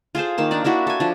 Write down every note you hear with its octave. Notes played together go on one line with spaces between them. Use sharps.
F4 G#4 A4 C5
D#3 A#3 A5
D4 D#4 D5
A#3 D4 E4 F#4
A4 G#5
F3 D4